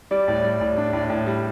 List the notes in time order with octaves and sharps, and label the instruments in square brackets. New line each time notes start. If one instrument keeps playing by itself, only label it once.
[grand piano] G3 [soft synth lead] D5
[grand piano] A2
G3
A2
D4
A2
A2
G3